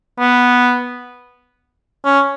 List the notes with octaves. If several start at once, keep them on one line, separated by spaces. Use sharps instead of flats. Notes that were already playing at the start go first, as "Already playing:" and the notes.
B3
C#4